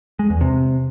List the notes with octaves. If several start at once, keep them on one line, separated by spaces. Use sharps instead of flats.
G#3
E2
C3